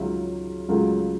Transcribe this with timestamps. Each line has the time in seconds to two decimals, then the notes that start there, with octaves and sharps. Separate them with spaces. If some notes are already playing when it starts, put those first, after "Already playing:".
Already playing: C#2 C#3 F#3 C#4 E5
0.69 C#2 C#3 F#3 A3